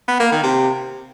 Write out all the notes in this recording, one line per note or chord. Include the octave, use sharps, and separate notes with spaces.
B3
A#3
D#3
C3